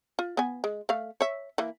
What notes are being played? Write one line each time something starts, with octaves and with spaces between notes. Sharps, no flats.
F4
B3 G#5
G#3
A3 F5
C#5 E5
E3 A#3